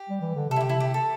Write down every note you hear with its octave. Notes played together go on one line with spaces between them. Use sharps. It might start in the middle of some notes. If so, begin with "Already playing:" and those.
Already playing: G4
G3
E3
D3
C3 A4
E4
G4
E4
G4
A4